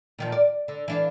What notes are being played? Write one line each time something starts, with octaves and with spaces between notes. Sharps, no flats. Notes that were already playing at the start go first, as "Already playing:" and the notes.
A#2 D#3 F3
D5
D3
E3 D4 F5